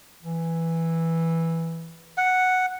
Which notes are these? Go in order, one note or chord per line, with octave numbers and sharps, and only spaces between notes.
E3
F#5